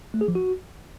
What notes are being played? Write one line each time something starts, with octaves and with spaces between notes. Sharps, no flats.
A3
G#4
F3
F#4